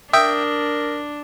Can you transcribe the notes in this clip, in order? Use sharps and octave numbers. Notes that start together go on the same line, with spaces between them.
D4 A#4 E5 G5 D#6